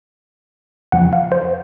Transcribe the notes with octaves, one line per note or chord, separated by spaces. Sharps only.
F2 C#3 F3 F#5
F5
C5